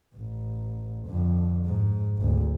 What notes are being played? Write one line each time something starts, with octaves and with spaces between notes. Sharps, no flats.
A1
F2 D3
G#2
G#1 D2